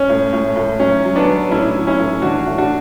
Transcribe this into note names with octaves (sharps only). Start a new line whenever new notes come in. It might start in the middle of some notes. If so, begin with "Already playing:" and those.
Already playing: C#4
A2
A2
A2
F#3 C#4
F#3
B3 D4
F#3
A2 C#4 E4
F#3
C#4 E4
A2
E3 D4 F#4
A2
D4 F#4